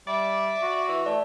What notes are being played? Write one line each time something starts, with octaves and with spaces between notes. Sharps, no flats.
G3 D5 E5
F#4
E3
A3 D5